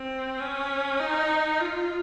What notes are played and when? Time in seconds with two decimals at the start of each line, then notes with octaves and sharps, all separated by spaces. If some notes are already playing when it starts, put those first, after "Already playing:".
Already playing: C4
0.40 C#4
1.00 D#4
1.60 F4